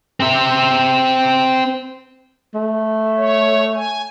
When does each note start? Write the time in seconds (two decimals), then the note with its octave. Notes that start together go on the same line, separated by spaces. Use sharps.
0.20 C4 E5
2.54 A3
3.16 C#5
3.74 G#5